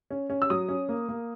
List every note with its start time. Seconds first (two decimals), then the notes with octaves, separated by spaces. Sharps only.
0.11 C#4
0.30 C#4
0.42 E6
0.50 F#3 D#6
0.69 C#4
0.89 A#3
1.09 A#3